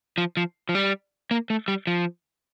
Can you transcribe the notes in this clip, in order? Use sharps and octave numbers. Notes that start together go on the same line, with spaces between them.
F3
F3
F3
G3
A#3
A3
G3
F3